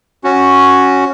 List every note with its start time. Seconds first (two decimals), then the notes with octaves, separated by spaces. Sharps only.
0.24 C#4 F#4